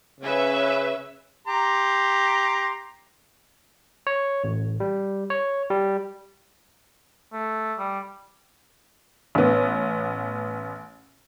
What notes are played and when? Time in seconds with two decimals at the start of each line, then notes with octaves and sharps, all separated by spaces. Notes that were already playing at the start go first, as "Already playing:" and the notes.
0.20 C#3 C#4 B4 E5
1.47 G4 A#5 C6
4.07 C#5
4.44 A1
4.80 G3
5.30 C#5
5.70 G3
7.33 A3
7.78 G3
9.35 A1 B3